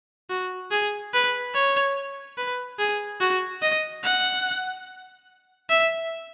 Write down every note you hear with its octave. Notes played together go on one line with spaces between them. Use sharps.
F#4
G#4
B4
C#5
B4
G#4
F#4
D#5
F#5
E5